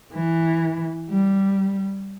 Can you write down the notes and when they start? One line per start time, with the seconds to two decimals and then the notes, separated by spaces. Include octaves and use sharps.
0.13 E3
1.10 G3